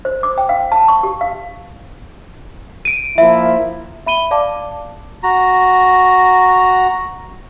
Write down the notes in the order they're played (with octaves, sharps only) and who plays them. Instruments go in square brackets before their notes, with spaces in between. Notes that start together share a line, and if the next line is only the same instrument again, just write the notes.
[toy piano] C5
D6
G5
F5
A5
C#6
G4
F5
[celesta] D7 D#7
[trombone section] F3 A#3 E4 [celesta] E5
[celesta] E5 B5 D#7 G7
D5 F5 A5 D6
[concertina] F#4 A#5